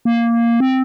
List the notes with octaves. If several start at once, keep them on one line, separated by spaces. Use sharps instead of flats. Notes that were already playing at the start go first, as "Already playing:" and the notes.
A#3
C4